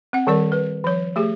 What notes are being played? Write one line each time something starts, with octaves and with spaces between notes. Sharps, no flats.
C4 F#5
D#3 G3 A#4 D5
B4
F3 C#5
A3 G4 G#4